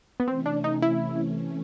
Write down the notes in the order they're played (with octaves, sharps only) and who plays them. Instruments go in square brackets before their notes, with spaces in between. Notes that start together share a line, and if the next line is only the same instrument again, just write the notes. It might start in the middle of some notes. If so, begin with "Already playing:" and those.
[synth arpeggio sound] B3
[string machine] C3 E3 A3 C#4 [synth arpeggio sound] C4
[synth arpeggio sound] D4
D#4
E4